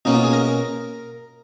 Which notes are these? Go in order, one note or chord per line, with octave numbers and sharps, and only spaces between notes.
B2 A#3 C#4 D#4
F4
G#4
A#4